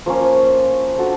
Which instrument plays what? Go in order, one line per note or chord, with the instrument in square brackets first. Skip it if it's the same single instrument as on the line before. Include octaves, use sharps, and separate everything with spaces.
[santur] F3 A#3 C#4
D4 F#4 A4 C5